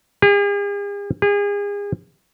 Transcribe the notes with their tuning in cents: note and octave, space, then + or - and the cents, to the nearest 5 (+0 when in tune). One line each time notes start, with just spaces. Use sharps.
G#4 -45
G#4 -35